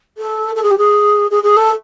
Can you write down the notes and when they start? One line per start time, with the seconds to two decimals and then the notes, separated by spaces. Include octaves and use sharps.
0.18 A4
0.55 A4
0.63 G#4
0.71 G4
0.78 G#4
1.31 G#4
1.43 G#4
1.57 A4